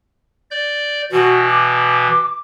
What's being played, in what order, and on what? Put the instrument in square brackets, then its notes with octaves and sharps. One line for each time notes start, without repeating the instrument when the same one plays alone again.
[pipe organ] D5 G6
[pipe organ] B2 E3 [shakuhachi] F#4
[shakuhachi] D6